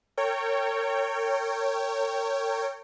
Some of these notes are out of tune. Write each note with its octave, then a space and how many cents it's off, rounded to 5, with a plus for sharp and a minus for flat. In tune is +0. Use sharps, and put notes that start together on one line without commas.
A#4 -40 C#5 +0 G5 +0